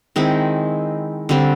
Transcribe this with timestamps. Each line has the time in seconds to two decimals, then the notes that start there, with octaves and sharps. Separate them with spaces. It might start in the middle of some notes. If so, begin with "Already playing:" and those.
0.16 D#3 G#3 C4 E4
1.29 D3 G3 C4